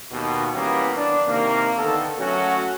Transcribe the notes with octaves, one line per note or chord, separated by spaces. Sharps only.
D#2 B2
E3 G3 A#3 B3 C#4
D4
C3 D#3 A#3
D3 D#3 B3 A4
F#3 A3 C#4 F#4